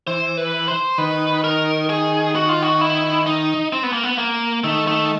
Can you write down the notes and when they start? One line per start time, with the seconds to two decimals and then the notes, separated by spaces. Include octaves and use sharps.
0.07 E3 C5
0.37 B4
0.68 C5
0.98 D#3 B4
1.44 A#4
1.90 G#4
2.35 F#4
2.49 F4
2.62 F#4
2.81 E4
3.27 D#4
3.72 C4
3.83 B3
3.93 A#3
4.03 B3
4.18 A#3
4.64 D#3 A3
4.87 A3